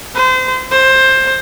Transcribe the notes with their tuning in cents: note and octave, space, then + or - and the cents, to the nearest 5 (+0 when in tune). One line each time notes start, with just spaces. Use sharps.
C5 -30
C5 +15